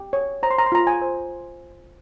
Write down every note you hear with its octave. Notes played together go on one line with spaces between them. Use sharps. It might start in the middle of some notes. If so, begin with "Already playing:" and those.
Already playing: G4
C#5
C5 A#5
C6
A#5
C6
F4 A#5
G#5
C5